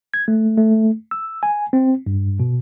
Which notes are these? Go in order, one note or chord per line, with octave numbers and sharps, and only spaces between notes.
G#6
A3
A3
E6
G#5
C4
G2
B2